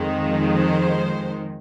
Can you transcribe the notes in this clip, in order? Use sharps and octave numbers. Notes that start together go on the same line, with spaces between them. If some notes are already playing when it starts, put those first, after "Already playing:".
Already playing: F2 D#3 G#3
C5